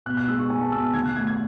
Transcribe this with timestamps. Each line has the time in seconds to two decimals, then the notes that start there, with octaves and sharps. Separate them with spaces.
0.06 B2 F#6
0.17 F#6
0.28 G#3 E6
0.39 C#6
0.50 G#3 G#5
0.61 A5
0.72 B2 E6
0.83 E6
0.94 D#3 G#6
1.06 F#6
1.16 A3 G#6
1.27 G#6